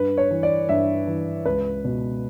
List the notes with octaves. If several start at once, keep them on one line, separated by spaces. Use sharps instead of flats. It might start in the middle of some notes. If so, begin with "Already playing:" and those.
Already playing: G2 B4
C#5
E3
D5
G2 E5
E3
C#2 B4
B2